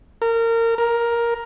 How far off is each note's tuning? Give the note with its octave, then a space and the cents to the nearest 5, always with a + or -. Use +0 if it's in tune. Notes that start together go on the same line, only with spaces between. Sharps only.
A#4 -25
A#4 +10